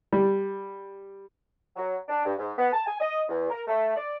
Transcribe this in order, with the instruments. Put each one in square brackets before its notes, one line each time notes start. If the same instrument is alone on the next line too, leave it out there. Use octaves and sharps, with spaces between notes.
[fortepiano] G3
[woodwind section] F#3
D4
G2
G#2
B3
A5
G#5
D#5
E2
A#4
A3
D5